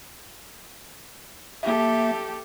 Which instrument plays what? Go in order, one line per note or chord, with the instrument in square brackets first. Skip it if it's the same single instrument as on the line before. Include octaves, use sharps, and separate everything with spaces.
[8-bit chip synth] A#3 E5 [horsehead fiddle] G4 A4